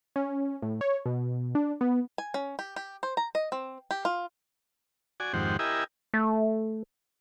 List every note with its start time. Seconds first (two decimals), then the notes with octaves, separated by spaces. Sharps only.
0.16 C#4
0.62 A2
0.81 C#5
1.06 B2
1.55 D4
1.81 B3
2.18 G#5
2.34 C#4
2.59 G4
2.76 G4
3.03 C5
3.17 A#5
3.35 D#5
3.52 C4
3.91 G4
4.05 F4
5.20 F#4 D5 G#5
5.33 F2 G#2 D#3 G4 C5 F#5
5.59 E4 G4 A#4 D#5 E5 G#5
6.14 A3